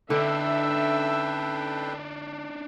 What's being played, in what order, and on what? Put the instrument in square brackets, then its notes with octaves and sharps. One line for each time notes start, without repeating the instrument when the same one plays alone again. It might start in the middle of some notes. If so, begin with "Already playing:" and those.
[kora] D3 [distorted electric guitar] D4 D#4 [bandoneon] A4 B4 G5 [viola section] E5